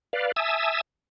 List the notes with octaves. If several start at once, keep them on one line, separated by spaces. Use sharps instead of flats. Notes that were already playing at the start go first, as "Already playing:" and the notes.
B4 D5 F5
E5 G#5 A5 D#6 E6